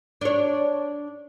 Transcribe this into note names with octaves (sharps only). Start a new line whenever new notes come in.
D4 C#5